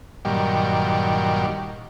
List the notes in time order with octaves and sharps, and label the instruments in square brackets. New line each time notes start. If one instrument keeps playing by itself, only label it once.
[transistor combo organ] G2 A#2 D#3 F#3 G3